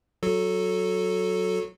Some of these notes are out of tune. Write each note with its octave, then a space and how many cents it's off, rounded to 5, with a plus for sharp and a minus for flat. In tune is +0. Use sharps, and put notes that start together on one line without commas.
F#3 +5 F#4 -20 A4 +0